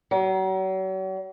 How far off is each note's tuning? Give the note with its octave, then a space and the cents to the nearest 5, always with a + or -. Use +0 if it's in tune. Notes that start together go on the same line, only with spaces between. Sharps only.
F#3 +40